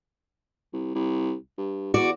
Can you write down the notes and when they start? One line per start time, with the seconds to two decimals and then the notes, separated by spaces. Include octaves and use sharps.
0.73 C2
0.95 C2
1.58 G2
1.94 E2 F#4 D5